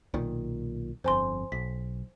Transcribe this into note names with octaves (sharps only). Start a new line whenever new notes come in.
B1 A#2 D#3
G1 F2 C5 G#5 C6
B1 B6